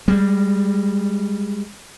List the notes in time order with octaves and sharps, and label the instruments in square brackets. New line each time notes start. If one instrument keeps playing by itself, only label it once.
[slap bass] G3 G#3